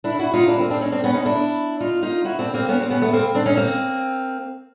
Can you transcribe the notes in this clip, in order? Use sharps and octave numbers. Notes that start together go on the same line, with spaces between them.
D4 E4
E4 F#4
D#4 F4
D4 E4
A#3 C4
C4 D4
C#4 D#4
C4 D4
B3 C#4
C#4 D#4
D4 E4
D#4 F4
D#4 F4
E4 F#4
C4 D4
A#3 C4
B3 C#4
A#3 C4
B3 C#4
A3 B3
A#3 C4
C4 D4
C#4 D#4
A#3 C4